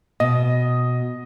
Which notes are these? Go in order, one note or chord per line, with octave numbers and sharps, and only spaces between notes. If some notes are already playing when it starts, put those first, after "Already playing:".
B2 D#5